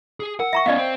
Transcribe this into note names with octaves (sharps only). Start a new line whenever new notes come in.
G#4
A#4 F#5
E5 A#5 C#6
B3 C#4 D5 D#5 F5
C4